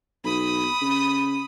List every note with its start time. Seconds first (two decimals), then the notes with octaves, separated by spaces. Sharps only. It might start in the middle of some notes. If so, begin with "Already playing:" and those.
0.24 B1 B5 D#6
0.81 C#3